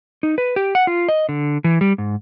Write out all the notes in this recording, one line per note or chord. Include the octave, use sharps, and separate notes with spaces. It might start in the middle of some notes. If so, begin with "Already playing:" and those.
D#4
B4
G4
F#5
F4
D#5
D3
E3
G3
G#2